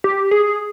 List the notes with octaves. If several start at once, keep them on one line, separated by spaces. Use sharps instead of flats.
G4
G#4